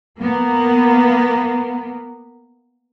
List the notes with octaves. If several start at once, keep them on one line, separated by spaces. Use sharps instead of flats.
A#3 B3